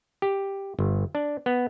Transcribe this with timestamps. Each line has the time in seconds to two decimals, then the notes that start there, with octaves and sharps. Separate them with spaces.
0.22 G4
0.79 G1
1.15 D4
1.46 B3